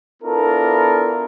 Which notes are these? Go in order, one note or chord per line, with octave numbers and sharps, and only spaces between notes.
B3 D4 E4 F4 A4 A#4